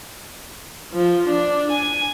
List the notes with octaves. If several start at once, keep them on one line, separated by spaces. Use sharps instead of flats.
F3
D4
G#5